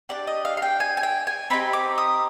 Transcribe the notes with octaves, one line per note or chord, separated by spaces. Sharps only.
D4 G4 D5
D#5
F5
F5
G5
G#5
G#5
G5
G#5
C4 D#4 G4 B5
D6
D#6